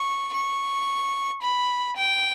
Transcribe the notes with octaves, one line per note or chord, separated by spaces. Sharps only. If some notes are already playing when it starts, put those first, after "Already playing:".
Already playing: C#6
C#6
B5
G5